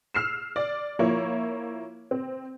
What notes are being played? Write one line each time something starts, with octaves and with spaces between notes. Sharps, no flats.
E6 F6 C7 E7
D5
F3 A#3 E4 C#5
C4